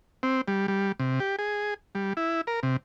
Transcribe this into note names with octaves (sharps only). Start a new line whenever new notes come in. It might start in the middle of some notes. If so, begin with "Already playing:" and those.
C4
G3
G3
C3
G4
G#4
G3
E4
A#4
C3